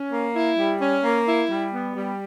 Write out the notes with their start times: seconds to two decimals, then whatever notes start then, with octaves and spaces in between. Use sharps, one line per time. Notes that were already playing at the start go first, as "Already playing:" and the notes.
Already playing: C#4
0.11 A#3
0.34 E4
0.57 G3
0.81 C#4
1.03 A#3
1.27 E4
1.50 G3
1.73 B3
1.96 G3